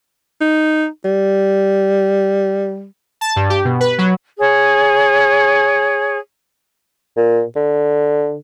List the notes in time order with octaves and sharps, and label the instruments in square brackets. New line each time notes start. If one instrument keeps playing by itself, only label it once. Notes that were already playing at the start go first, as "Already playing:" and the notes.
[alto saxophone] D#4
G3
[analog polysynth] A5
G2
G4
B2
B4
F#3
[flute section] G#4 C#5
[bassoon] A#2
D3